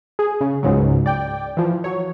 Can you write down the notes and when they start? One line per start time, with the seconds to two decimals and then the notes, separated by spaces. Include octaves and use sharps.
0.19 G#4
0.41 C#3
0.63 C#2 G#2 C#3 F#3
1.06 D5 G5
1.57 E3 F3
1.84 F#3 C#5